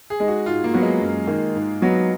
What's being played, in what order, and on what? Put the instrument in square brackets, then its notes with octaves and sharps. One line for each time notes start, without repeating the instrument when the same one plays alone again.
[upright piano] G#4
[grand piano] G#3 D#4
[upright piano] F#4
[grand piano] G#2 [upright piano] F4
[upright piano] A#3
[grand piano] F#3 B3 F#4
[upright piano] G#3
[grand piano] F#2
D#3 A#3
G#2
F#3 B3 D#4 F#4